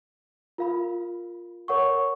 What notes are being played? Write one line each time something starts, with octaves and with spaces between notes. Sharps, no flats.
F4 A#4 F5 B5
A#4 C#5 F#5 C#6